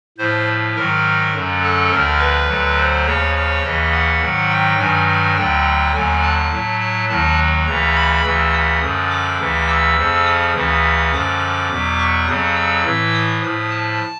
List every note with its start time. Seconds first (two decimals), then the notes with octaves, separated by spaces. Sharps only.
0.18 A2 F3 C5
0.76 G#2 D#3 F#3 A#4
1.34 F#2 D3 F#3
1.63 A4
1.91 D2 D3 F3 A#4
2.19 B4
2.48 D2 D3 F#3
2.78 C5
3.06 D#2 C#3 F3 C#5
3.35 C#5
3.64 D#2 C#3 E3 D#5
3.92 F#5
4.21 G#2 D#3 F#3
4.50 G5
4.79 G2 D#3 F#3 G#5
5.08 G#5
5.36 D2 D3 F#3 G5
5.94 D#2 D3 F#3 G#5
6.23 A5
6.52 A2 F#3
6.80 A5
7.09 D#2 D#3 F#3 A5
7.66 D2 C#3 E3 A#5
7.95 B5
8.24 D2 C#3 E3 E6
8.53 D#6
8.81 F#2 D3 F3 D#6
9.10 D6
9.39 D2 C#3 E3
9.68 E6
9.97 F2 C#3 F3
10.26 D#6
10.54 D2 C#3 E3
11.12 F#2 D3 F3 D6
11.70 E2 B2 F#3
11.98 C#6
12.26 F2 C#3 F#3 D#6
12.56 E6
12.84 A2 E3
13.14 D#6
13.42 A2 F3 D#6
13.70 A5